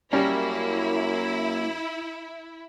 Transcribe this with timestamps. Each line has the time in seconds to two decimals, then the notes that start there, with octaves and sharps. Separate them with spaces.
0.13 F#2 G3 A#3 C#4 E4